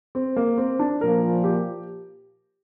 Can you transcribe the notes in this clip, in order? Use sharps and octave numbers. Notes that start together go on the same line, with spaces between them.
C4
A#3
C4
D4
A#2 F3 A#3 A#4
G4